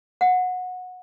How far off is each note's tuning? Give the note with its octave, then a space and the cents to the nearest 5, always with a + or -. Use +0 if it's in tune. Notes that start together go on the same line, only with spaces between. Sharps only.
F#5 -20